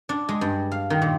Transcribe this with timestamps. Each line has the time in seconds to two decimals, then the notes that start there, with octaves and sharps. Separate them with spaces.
0.09 D4
0.29 G#3
0.41 G2
0.71 F5
0.90 D#3
1.02 A#2